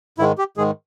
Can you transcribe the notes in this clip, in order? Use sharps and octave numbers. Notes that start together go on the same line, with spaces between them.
G#2 D#3 G#3 E4
G4
G#2 D#3 G#3 G#4